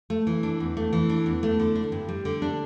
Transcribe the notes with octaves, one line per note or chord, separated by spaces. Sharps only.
A3
E3
D4
E2
A3
E3
D4
E2
A3
D3
D4
G2
G3
D3
D4